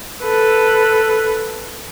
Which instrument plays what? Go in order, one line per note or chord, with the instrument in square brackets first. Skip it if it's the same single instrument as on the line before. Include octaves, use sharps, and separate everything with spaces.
[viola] A4 B4